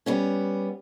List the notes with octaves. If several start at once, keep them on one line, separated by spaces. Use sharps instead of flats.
G3 B3 C#4